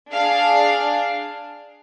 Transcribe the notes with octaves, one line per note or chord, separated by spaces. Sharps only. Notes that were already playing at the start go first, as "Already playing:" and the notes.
D4 G#4 F5